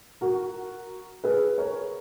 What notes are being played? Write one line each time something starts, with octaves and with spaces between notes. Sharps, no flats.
F#4 A#4
G#4 B4
A#4 C#5